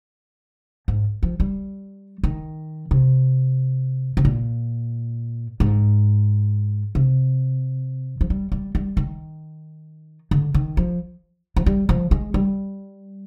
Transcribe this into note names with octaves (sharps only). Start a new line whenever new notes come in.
G#2
F3
G3
D#3
C3
C3
A#2
G#2
C3
F3
G3
G3
G3
D#3
D3
D#3
F3
F3
G3
F3
G#3
G3